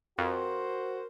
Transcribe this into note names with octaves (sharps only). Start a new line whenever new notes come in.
F2 F#4 A#4 C5